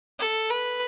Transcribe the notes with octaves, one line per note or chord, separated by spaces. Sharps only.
A4
B4